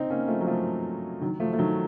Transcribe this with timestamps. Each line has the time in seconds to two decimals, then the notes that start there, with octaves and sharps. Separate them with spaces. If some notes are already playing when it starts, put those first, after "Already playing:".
Already playing: C4 D#4
0.10 A#3 C#4
0.28 F3 A3
0.40 F#3
0.47 F3 A3
1.21 D#3 F#3
1.40 F3 A3
1.53 A3
1.59 D#3 F#3